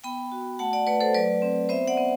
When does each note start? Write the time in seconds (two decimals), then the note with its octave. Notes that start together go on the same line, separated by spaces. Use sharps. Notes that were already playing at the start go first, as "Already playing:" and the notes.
0.04 B3 G5 B5
0.32 F#4
0.59 A3 F#5 A5
0.73 D5 F#5
0.87 A3 B4 D5
1.01 A4 C5
1.14 F#3 B4 D5
1.42 C4
1.69 B3 C5 E5
1.88 D5 F#5
1.97 B3